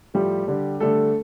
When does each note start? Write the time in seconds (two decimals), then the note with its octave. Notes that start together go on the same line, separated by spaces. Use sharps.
0.14 A2 F3 G3 A3 G4
0.47 D3 G3
0.80 D3 G3 A3 A4